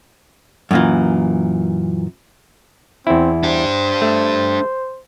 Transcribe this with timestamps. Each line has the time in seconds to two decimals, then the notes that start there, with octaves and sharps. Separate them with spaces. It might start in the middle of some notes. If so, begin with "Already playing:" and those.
0.71 F#2 A#2 E3
3.07 E2 C4 E4
3.44 D4 G4 C5
4.02 A3